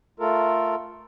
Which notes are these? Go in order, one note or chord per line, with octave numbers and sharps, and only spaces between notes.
A3 F4 A4 A#4